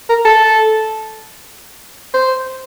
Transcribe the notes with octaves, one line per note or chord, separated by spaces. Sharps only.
A#4
A4
C5